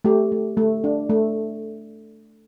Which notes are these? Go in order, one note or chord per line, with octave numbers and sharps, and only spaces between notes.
A3 G4
A3
A3
D4
A3